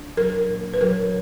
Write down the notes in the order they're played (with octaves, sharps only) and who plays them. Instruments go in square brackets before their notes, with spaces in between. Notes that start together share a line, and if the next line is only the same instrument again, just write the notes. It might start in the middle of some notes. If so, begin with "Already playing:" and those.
Already playing: [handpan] D4
[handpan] F#3 [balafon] A#4
[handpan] A#2
[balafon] B4
[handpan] F#3 [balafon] A#4